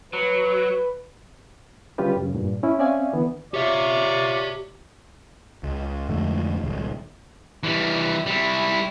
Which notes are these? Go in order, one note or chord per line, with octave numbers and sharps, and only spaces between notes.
F#3 B4
D3 G3 C#4 F4 G4 B4
F#2 C#3
G2 A#2
C#4 E4
C4 C#4 D5 E5 F5 G#5
D3 E3 B3
F4 G4 C#5 D5 E5
C#2
F2 G#2 D3 A3
D#1 C#2
E3 G3
G3 E4